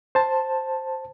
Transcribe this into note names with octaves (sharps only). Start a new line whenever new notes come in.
C5 A5